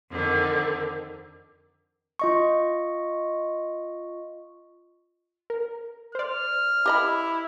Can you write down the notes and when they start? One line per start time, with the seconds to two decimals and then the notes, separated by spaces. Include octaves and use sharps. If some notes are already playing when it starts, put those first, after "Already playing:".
0.11 F2 D3 D#3
2.19 F4 D#5 C#6
5.50 A#4
6.15 C5 D5 F6
6.86 E4 G4 D#5 B5